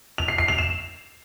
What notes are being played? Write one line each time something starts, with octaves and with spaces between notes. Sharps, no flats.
F7
C7
C7
F7
E7